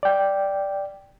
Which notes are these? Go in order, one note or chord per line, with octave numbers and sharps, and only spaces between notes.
D5 G5